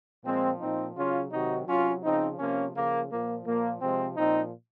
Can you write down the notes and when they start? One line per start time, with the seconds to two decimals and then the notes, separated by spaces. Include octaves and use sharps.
0.24 A#2 F3 G#3 C4
0.60 A#2 F3 C4 D#4
0.96 C#3 F#3 C#4 F4
1.32 C3 D#3 F#3 D#4 F#4
1.67 C3 F#3 C#4 F4
2.03 C#3 F3 C4 D#4
2.38 C3 F3 A#3 C#4
2.75 C#3 F3 A#3
3.10 A#2 F3 A#3
3.46 A#2 F3 A#3
3.81 C3 F3 G#3 C4
4.17 A#2 F3 C4 D#4